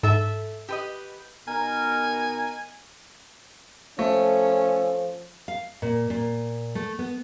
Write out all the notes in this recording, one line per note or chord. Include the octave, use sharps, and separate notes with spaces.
G#2 A4 E5
G4 B4 D#5
B2 D#4 A#4 G#5
F3 A3 C#4 A4
F5
A#2
A#2
A3
B3